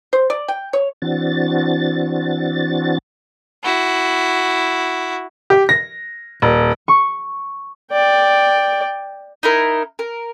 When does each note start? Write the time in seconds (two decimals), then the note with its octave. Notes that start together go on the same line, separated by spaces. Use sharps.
0.13 C5
0.30 D5
0.48 G5
0.73 C#5
1.02 E3 C4 D4 F#4 A6
3.63 E4 F#4
5.50 G4
5.69 A#6
6.42 D#1
6.88 C#6
7.92 D5 G5
9.43 D#4 E4 A#4
9.99 A#4